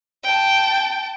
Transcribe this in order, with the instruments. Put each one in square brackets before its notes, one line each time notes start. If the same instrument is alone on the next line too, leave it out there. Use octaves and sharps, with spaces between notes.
[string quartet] G5 A5